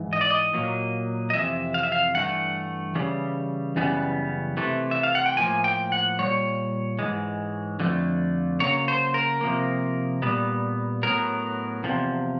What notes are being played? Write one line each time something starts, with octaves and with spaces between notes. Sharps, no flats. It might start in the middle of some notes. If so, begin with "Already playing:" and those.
Already playing: G#2 E3
D#5
D5
D#5
A#2 F#3 A#3
D#5
F2 C3 E3 E5
F5
E5
F5
G2 E3 A3 F#5
C#3 E3 G3
F#2 C#3 E3 G3 B3
C3 E3 A3
E5
F5
F#5
G5
A2 F3 A#3 G#5
G5
F#5
A#2 G3 C#5
G#2 E3 G#3
F2 D3 F3 A3
C#3 F#3 A#3 C#5
C5
A#4
C3 F3 A#3
A#2 G3 B3
A2 F#3 B3 A#4
E2 C3 F3